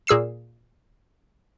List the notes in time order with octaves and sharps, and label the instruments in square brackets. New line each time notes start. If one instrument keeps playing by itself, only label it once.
[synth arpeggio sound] A#2 G#4 E6 C7 E7